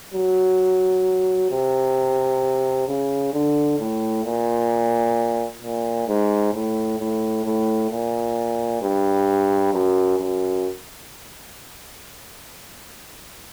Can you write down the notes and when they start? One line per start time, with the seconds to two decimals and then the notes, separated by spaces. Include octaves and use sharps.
0.14 F#3
1.50 C3
2.88 C#3
3.33 D3
3.79 A2
4.24 A#2
5.62 A#2
6.08 G#2
6.54 A2
6.99 A2
7.45 A2
7.91 A#2
8.82 G2
9.73 F#2
10.18 F#2